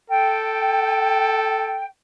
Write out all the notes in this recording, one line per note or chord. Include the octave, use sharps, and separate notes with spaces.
A4 G5